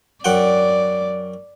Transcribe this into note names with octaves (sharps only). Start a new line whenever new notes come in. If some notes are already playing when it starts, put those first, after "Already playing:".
F#2 D5 F#5 G5